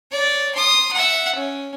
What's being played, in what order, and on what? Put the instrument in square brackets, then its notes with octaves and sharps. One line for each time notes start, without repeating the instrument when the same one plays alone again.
[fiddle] C#5 D5
C6 D#6
E5 F#5
C#4